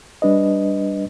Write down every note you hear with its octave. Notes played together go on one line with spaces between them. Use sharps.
G3 D4 B4 D#5